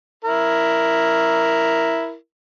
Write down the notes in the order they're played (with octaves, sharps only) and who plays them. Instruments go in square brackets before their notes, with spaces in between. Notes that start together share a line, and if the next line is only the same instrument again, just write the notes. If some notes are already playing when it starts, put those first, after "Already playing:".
[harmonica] E4 A#4